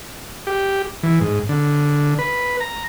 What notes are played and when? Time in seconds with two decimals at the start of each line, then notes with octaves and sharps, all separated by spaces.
0.47 G4
1.03 E3
1.21 G#2
1.49 D3
2.19 B4
2.61 A#5